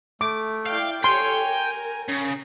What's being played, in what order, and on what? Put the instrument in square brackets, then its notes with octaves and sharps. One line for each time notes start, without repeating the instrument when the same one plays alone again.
[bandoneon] A3 [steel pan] D6
[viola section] E4 D5 G5 [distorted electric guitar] F5
[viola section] G4 A4 C#5 [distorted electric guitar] G5 [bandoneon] G#5 [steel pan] C6
[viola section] A#4
[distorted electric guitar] C#3